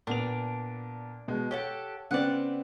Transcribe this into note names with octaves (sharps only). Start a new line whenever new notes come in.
A#2 B3 D4 F7
B2 G#3
G4 A4 C#5 F#5
C#3 B3 C4 D5 F#5